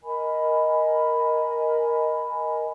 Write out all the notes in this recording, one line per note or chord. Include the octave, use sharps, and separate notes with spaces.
A#4 D#5 G#5 B5